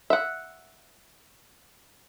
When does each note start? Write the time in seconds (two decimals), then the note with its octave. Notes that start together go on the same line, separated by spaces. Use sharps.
0.10 E5 F#5